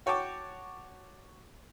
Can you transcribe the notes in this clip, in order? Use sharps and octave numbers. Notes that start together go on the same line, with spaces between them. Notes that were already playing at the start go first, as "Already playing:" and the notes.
F#4 C#5 G5 A5 C#6 D6